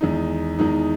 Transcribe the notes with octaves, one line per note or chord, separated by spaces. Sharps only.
E2 D#3 G#3 D#4
E2 D#3 G#3 D#4